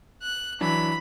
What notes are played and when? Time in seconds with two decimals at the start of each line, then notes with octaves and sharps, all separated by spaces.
0.23 F#6
0.61 E3 F#3 D4 B5